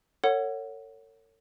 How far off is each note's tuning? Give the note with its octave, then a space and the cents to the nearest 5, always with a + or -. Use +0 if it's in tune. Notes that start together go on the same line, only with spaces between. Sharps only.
A4 +45 C#5 +5 F#5 +0